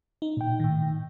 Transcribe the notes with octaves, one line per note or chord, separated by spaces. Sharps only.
D#4
A#2 G5
A2 D#3